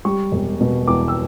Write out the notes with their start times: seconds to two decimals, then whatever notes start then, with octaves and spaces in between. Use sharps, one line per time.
0.05 G3 C#6
0.32 E1
0.61 B2
0.88 E2 D6
1.08 E6